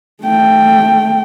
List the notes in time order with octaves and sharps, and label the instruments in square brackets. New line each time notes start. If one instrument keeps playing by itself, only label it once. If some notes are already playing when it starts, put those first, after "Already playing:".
[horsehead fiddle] A3 G5